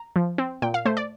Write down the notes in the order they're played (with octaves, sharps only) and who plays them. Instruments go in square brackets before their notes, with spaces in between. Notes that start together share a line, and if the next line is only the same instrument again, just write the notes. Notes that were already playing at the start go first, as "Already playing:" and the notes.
Already playing: [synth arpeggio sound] A#5
F3
C4
A#2 G5
F5
A3 C5
D5